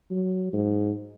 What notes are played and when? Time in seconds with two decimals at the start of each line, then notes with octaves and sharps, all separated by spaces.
0.11 F#3
0.53 G#2